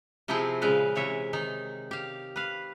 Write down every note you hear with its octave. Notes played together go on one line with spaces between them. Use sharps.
C3 F3 C4 E4 G#4 C5
A#2 C#3 G#3 B4 F5
C3 E3 C#5 E5
D#3 D#4
G4 F5
B4 F5